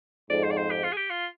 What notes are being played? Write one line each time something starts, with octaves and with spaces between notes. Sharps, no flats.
F2 G#2 D5
C5
D5
C5
G4
F4
G#4
G4
F4